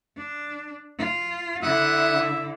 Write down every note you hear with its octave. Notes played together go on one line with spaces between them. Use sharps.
D4
F4
D3 E4 E5 F#5 D#6 F#6